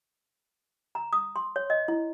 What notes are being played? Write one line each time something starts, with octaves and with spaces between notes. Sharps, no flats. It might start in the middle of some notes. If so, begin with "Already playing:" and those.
A#5
D#6
C6
C#5
D#5
E4